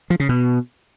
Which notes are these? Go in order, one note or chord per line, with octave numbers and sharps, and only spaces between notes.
F3
C#3
B2